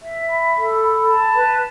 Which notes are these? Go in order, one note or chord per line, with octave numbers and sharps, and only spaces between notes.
E5
B5
A4
B5
A5
B4